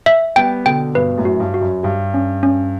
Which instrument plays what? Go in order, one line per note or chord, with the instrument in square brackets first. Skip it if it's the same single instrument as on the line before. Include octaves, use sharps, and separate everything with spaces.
[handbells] E5
[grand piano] G3 B3 [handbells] G5
[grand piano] B2 D3 [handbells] G5
[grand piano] G2 B2 [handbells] B4
[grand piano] F#2 A2
[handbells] F#4
[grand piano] G2
[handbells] F#4
[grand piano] F#2
[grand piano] G2 [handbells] G4
[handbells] C#4
C#4